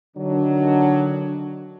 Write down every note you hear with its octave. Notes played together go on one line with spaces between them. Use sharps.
D3 D#3 F#3 D4